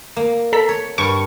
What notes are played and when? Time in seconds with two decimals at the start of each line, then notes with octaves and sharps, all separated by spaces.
0.16 A#3
0.53 A4 A#5 B6
0.69 C#5
0.98 G2 A#4 C#6